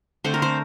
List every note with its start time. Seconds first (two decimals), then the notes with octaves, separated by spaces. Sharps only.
0.24 D3 A3 C4 C5
0.34 A#4
0.42 C4 C5